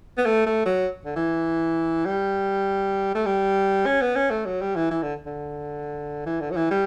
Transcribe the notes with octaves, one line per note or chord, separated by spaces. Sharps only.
B3
A3
A3
F#3
D3
E3
G3
A3
G3
C#4
B3
C#4
A3
F#3
G3
E3
E3
D3
D3
E3
D3
F#3
E3
G3